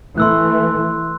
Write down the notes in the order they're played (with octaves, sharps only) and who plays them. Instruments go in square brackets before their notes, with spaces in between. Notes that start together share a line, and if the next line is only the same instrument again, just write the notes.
[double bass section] E3 A3 [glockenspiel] C6 E6 F#6